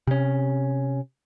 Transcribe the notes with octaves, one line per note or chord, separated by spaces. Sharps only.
C3 C#4